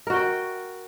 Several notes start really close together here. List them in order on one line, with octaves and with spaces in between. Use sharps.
A#4 F#4 G5